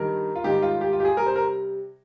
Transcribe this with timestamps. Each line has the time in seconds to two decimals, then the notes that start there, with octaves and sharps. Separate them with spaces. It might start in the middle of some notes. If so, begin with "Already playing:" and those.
Already playing: G2 D#3 G3 A#4
0.36 F4
0.44 G#2 D#3 G3 G4
0.62 F4
0.81 G4
0.93 F4
1.00 G4
1.05 G#4
1.17 C3 G3 A#4
1.26 C5
1.36 A#4